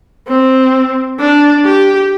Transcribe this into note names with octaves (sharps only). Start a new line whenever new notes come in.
C4
D4
G4